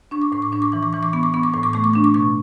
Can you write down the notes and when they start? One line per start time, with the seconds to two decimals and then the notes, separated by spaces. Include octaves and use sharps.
0.11 D4 C#6
0.22 D6
0.32 A2 C#6
0.42 D6
0.52 D4 C#6
0.62 D6
0.72 E3 C#6
0.83 D6
0.93 E3 C#6
1.03 D6
1.13 B3 C#6
1.23 D6
1.34 B3 C#6
1.43 D6
1.54 A2 C#6
1.63 D6
1.73 A3 C#6
1.84 D6
1.93 D4 C#6
2.04 D6
2.14 B2 C#6